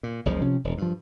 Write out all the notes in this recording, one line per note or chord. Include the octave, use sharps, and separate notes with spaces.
A#2
F#1 C#2 C#3 F3
C3 F3 C#4
E1
G2 F3